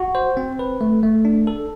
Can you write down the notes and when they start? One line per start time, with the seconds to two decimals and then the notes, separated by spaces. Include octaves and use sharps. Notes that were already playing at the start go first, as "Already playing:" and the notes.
Already playing: F#4
0.15 C5
0.37 C4
0.59 B4
0.81 A3
1.03 A3
1.25 D4
1.47 A4